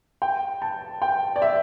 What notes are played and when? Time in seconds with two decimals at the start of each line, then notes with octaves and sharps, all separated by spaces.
0.22 G5
0.62 A5
1.02 G5
1.36 D5
1.42 E5